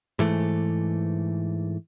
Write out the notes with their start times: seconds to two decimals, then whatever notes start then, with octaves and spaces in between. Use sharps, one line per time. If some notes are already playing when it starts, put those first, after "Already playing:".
0.19 G#2 E3 A3